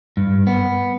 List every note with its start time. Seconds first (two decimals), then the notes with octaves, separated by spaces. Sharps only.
0.17 G2
0.47 B3